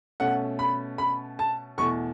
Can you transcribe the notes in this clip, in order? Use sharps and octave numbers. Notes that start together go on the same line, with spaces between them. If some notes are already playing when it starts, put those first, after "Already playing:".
B2 A3 C#4 F#5
B5
B5
A5
E2 B2 A3 C#6